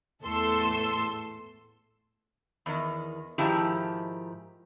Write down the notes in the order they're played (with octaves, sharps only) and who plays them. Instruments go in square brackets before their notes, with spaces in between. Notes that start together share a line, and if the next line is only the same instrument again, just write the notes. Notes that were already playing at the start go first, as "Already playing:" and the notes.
[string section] E2 A2 A3 A4 C6 E6
[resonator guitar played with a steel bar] E2 D#3
G#2 D#3 F3 E4 G4 A5